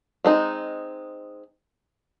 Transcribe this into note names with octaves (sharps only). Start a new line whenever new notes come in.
G#3 C4 D#4